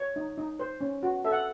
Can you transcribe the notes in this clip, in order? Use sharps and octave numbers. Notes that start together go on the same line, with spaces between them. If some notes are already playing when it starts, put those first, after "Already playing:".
Already playing: C#5
D#4
D#4
C5
C#4
F#4
A4 E5
F#5